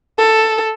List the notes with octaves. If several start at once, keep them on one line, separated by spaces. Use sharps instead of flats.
A4